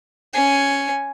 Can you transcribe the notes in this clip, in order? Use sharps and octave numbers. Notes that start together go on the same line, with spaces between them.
C#4 G#5